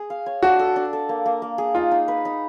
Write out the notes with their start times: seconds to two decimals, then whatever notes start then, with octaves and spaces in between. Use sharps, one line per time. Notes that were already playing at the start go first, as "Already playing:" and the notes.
Already playing: G#4
0.10 F5
0.26 C#5
0.43 D4 F#4
0.59 A4
0.76 D4
0.93 A4
1.09 A#3
1.26 A#3
1.42 A#3
1.58 G#4
1.75 D#4 F4
1.91 D#4
2.08 B4
2.25 D#4